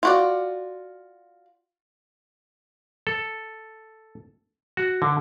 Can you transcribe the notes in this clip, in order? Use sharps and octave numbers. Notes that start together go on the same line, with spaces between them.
F4 F#4 D5
A4
F#4
D3